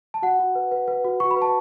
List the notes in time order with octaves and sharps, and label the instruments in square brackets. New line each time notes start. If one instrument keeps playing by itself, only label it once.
[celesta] A5
F#4 F#5
F#4
B4
B4
B4
F#4
F#4 C#6
B5
B4
A5